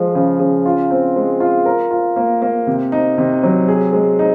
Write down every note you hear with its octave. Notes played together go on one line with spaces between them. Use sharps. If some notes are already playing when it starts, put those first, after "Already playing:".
Already playing: F3 G#3
C#3
C#3
F4
C4
G#3
F4
A#4
F4
A#3
A#3
C3
D#4
C3
F#3
G#4
G#3
D#4